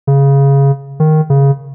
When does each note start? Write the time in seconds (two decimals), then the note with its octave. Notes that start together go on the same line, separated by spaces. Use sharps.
0.07 C#3
1.00 D#3
1.30 C#3